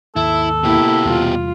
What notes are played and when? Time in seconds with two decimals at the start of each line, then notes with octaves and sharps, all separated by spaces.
0.16 D#2 G#2 E4 A4
0.63 B2 A#3 E4 G4
1.05 E2 C3 G3 F4